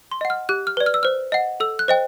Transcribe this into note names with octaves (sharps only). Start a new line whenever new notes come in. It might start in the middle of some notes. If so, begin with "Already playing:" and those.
C6
D#5 F#5
F6
G4 F#6
F6
B4 D5
F6
E6
C5 F6
D#5 F#5
A4 E6
F#6
C5 D#5 G5